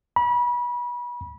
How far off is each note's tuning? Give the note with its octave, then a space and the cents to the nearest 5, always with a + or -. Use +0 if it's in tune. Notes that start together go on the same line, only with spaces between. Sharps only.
B5 -30